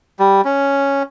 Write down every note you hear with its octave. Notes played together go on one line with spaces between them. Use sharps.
G3
C#4